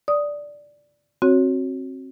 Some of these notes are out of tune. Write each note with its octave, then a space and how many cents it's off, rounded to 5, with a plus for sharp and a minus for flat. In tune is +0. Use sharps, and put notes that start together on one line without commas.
D5 -5 D#6 +0
C4 +25 F#4 -5 C#5 +0